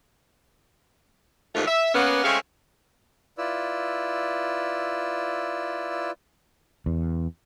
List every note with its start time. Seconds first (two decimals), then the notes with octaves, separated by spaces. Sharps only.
1.55 D#2 G#2 E3 F3 A3 F4
1.67 E5
1.94 A#3 B3 C#4
2.24 G#3 A3 C4 C#4 G#4 F5
3.38 E4 F4 B4 D5 E6
6.86 E2